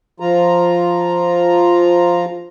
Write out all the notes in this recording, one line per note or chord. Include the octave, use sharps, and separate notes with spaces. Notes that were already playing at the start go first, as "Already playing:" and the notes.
F3 F4 A#5